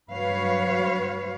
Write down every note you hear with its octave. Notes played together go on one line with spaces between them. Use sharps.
G2 F#3 F#4 B4 C#5 F5